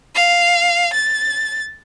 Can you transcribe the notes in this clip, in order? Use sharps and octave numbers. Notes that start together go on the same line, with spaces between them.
F5
A6